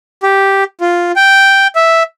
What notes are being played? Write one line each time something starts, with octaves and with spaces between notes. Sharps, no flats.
G4
F4
G5
E5